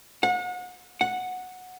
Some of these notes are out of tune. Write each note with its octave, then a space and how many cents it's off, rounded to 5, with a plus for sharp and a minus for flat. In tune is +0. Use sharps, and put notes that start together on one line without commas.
F#5 -35
F#5 -10